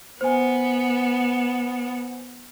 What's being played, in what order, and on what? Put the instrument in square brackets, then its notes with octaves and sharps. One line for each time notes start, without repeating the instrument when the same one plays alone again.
[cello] B3 [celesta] C5 G#5